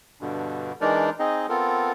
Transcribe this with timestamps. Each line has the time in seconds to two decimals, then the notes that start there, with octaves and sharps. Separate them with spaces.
0.21 G2 B2 D3
0.81 E3 G#3 D4 D#4 A#4 D5
1.19 C4 D#4 G#4 D#5
1.49 B3 C4 F4 A4 A#4